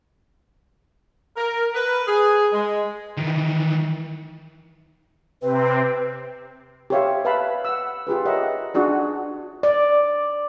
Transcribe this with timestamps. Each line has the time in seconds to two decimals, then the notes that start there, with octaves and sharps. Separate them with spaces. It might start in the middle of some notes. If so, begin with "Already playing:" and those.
1.37 A#4
1.74 B4
2.08 G#4
2.53 G#3
3.17 D#3 E3
5.41 C3 C4 B4
6.90 G4 A#4 C5 C#5 E5 F5
7.25 B4 E5 F5 A5 B5
7.65 F#5 E6
8.07 F4 G4 G#4 B4
8.25 G4 A#4 C#5 D#5 E5 F#5
8.74 D4 F4 F#4 G#4 D5
9.63 D5